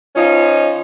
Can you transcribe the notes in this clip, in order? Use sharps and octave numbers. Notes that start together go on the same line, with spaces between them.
F3 C#4 D#4 F4